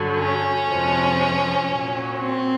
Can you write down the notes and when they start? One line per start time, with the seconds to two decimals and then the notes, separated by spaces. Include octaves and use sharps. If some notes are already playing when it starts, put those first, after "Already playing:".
Already playing: G2 D3 F#3
0.19 C#4
0.69 F2 C3 F3 G#3
1.69 A#2 F#3
2.19 C4